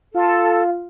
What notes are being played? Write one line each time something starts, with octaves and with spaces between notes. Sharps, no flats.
F4 A4